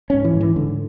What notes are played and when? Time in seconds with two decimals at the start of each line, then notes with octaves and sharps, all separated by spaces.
0.10 G#2 C#4
0.25 E3
0.35 G#2
0.41 E3
0.56 G#2 D3